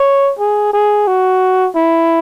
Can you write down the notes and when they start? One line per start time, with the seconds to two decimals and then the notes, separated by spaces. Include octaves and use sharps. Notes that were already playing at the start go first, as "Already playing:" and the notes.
Already playing: C#5
0.39 G#4
0.73 G#4
1.07 F#4
1.75 E4